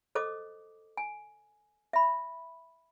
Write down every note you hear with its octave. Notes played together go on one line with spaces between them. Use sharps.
A4 C5 D#5 D6 D#6
G#5
E5 B5